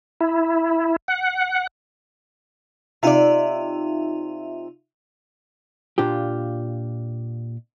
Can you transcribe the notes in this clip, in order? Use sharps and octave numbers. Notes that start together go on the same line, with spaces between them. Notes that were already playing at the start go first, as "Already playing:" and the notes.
E4
F#5
C3 D#4 F4 D5 E5
A#2 D4 F4 G4